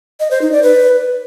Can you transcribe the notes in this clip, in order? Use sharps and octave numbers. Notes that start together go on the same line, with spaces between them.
D#5
C5
D#4
D5
B4